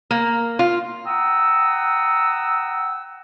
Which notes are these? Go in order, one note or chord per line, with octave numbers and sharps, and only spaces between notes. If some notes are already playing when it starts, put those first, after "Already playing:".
A#3
F4
F#5 G5 A#5 D#6 E6